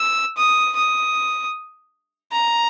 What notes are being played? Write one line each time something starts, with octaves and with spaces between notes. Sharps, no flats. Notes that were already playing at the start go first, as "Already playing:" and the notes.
Already playing: E6
D#6
D#6
A#5